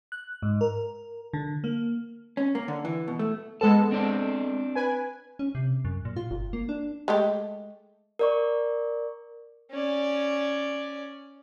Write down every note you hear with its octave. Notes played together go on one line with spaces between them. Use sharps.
F#6
G#2
A#4
D3
A#3
C#4
A#3
D3
E3
B2
A3
G#3 B3 A4 A5
C4 D4 C5
B4 G#5
C#4
C3
F#2
A#2
F4
G1
A#3
D4
G#3 A3 G4
A#4 D5 C#6
C#4 D5